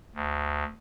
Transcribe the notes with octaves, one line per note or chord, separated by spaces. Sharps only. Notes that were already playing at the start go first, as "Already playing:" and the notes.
D2